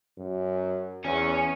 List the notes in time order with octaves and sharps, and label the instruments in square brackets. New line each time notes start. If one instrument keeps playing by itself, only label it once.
[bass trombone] F#2
[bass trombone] E2 [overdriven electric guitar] C#4